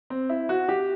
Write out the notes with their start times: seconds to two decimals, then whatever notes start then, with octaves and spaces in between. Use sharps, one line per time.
0.10 C4
0.29 E4
0.49 F#4
0.69 G4